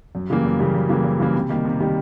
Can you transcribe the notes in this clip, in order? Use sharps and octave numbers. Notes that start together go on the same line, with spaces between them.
F#2
C#3 E3 G3 A#3
F#2
C#3 E3 G3 A#3
F#2
C#3 E3 G3 A#3
F#2
C#3 E3 G3 A#3
C3
D#3 G3 A#3
C3
D#3 G3 A#3